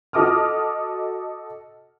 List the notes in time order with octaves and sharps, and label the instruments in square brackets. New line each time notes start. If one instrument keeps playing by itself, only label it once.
[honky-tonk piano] F#4 A4 D#5 D6 D#6 F6